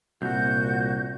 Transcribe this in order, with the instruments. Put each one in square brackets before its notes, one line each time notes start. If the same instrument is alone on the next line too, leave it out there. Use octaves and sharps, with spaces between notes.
[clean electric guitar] C2 [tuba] A#2 [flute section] F#4 G6